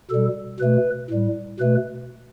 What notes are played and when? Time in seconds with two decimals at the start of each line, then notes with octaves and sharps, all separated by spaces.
0.11 B2 G3 A4
0.60 B2 A3 B4
1.10 A2 G3
1.60 B2 A3 B4